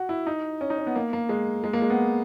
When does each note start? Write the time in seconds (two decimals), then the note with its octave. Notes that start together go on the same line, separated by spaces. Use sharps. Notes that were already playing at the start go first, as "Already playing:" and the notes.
Already playing: F#4
0.09 E4
0.27 D#4
0.61 C#4
0.70 D#4
0.78 C#4
0.87 B3
0.96 A#3
1.13 A#3
1.29 G#3
1.64 G#3
1.73 A#3
1.82 G#3
1.90 B3